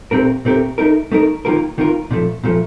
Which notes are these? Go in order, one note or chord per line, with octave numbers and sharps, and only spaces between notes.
A#2 A3 C4 G4 A#4
A#2 A3 C4 G4 A#4
A3 D#4 A#4
A3 D#4 A#4
D#3 A#3 F4 A#4
D#3 A#3 F4 A#4
A#2 F3 A3
A#2 F3 A3